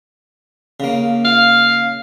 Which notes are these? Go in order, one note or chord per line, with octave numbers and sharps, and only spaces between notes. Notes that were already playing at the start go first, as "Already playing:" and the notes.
C#3 A#3
F5